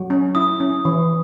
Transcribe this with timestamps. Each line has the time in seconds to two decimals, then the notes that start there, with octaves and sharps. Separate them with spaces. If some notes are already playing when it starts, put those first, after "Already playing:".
Already playing: F#3
0.10 C#4
0.35 E4 D#6
0.60 C#4
0.85 E3